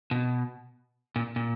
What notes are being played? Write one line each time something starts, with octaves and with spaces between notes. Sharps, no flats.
B2
A#2
A#2